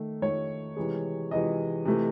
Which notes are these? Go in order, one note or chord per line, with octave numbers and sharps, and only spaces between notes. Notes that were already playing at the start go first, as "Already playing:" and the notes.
Already playing: D#3 A3
D#3 A3 C#5
C3 E3 G#3
C3 E3 G#3 D#5
C3 E3 A3